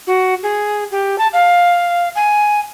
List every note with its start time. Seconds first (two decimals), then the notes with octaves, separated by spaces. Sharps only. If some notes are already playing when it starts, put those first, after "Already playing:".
0.07 F#4
0.43 G#4
0.91 G4
1.18 A5
1.33 F5
2.15 G#5